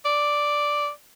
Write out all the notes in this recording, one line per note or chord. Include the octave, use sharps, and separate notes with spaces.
D5